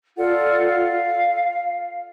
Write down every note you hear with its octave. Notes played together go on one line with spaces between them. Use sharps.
F4 A4 D5 F#5
F5